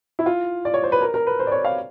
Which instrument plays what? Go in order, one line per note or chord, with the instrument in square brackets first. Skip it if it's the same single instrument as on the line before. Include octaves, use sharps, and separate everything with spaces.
[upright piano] E4
F4
D5
C#5
C5
B4
A#4
A#4
B4
C5
D5
C#5
F5